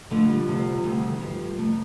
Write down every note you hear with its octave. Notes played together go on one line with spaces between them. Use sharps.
F2 D3 F3 A3
G3
D2 C3 F3
D2 C3 D#3
G2 F3 G3
F2 C3 F3 A3